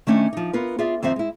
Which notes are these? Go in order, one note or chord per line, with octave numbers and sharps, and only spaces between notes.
D#3 A3 C#4 D4 C#5
F3 D#4
B3 F4 A#4 B4
F4 G#4 D5 E5
F2 D#3 C4 E5
G#3 E4